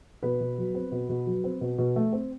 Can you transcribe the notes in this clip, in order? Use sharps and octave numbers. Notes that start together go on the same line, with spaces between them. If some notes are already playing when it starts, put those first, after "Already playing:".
B2 B3 B4
B2
F#3
C4
B2
B2
F#3
C4
B2
B2
A3
C4